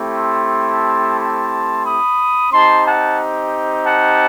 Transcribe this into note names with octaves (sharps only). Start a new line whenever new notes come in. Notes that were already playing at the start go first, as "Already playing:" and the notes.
Already playing: A3 C4 E4 G4
A5 C6
A5 C6
B5 D#6
C4 D#4 G4 A5 C6
F#5 A5
F#5 A5